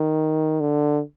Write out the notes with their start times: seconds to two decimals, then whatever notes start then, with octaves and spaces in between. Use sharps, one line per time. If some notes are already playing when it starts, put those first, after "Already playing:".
Already playing: D#3
0.61 D3